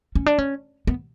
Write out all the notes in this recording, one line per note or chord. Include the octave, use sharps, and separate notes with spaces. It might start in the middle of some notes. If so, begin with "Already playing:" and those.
C#4
D4
C#4
B3